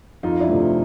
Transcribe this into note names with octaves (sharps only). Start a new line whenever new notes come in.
F2 D#4 F4
D4 E4
C3 F3 A3